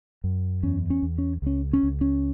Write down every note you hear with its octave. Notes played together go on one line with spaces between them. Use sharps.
F#2
E2 C#4
C#4
E2
C#4
C#2 C#4
C#4
C#2
C#4